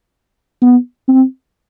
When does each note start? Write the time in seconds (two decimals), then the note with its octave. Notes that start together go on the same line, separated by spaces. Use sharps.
0.62 B3
1.08 C4